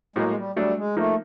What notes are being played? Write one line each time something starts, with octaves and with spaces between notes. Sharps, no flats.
A2 F#3 G#3 A#3
G#3
G3
F#3 G3 A3 D4
G#3
F3 A3 A#3 D#4